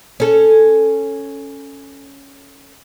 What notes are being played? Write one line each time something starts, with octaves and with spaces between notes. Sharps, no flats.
C#4 A4